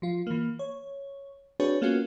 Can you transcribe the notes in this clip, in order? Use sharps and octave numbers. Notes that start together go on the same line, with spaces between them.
F3 F4
E3 A#3
C#5
C4 D4 F#4 G#4 B4 C#5
A#3 B3 C#4 F4 F#4